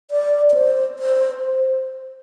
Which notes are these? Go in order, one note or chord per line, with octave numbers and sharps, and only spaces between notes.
D5
D5
C5
C5